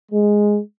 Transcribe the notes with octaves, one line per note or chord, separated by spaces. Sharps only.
G#3